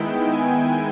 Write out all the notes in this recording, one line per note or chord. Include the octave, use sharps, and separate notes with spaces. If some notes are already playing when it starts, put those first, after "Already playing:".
Already playing: D#3 G#3 B3 E4 G5
G#5